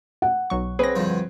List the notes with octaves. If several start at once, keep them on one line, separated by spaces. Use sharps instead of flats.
F#5
B1 F#3 C#6
C4 G#4 B4 C#5 A#6
D2 G2 F3